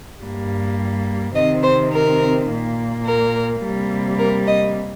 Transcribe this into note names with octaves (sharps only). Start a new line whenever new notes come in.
G2 G3 A#3
C3 D#3 C4 D#5
C5
A#4
A#2 A#3
A#4
C3 G3 A#3
A#4
D#5